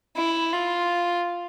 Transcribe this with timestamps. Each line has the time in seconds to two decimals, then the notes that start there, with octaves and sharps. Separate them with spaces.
0.16 E4
0.53 F4